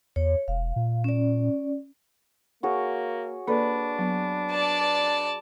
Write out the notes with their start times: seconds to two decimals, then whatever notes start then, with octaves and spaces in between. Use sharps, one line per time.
0.16 E2 C#5
0.48 E1 F5
0.76 A#2
1.04 C#4 D5
2.63 A#3 F#4 G#4 C#5
3.47 A#3 D4 A4 B4 D5
3.99 F#3 B3
4.52 D5 A5